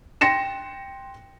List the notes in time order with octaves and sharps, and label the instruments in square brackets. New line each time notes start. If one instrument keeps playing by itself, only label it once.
[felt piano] G5 C6 A#6 C#7 E7